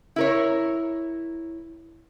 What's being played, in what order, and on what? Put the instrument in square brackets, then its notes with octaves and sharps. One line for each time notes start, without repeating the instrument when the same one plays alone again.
[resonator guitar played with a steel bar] E4 A#4 C#5